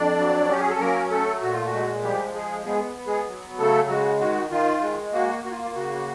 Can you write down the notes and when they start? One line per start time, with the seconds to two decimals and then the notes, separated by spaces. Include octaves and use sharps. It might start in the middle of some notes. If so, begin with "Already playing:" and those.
Already playing: F2 D4 D5
0.18 F#3
0.49 C#4 G4
0.60 G#4
0.70 A4
0.80 F#3 A#3 A#4
1.11 A3 A4
1.42 A#2 F#4
1.53 F4
1.65 F#4
1.73 G#3
2.03 F3 G3 G4
2.34 G#3 G#4
2.66 G#3 B3 G#4
2.96 B3
3.07 G#3 G#4
3.28 F#3
3.58 C#3 A3 A4
3.89 G#3 F#4
4.20 D#3 F#4
4.51 D#3 F4
4.82 G#3
5.13 A#3 F#4
5.44 A#3 F#4
5.51 F4
5.65 F4
5.75 C#3 F#4